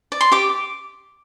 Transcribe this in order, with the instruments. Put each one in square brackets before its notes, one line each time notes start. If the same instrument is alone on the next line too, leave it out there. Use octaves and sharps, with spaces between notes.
[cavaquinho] D5
C6
G4 D6